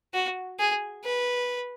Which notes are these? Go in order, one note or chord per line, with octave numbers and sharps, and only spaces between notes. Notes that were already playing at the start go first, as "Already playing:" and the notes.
F#4
G#4
B4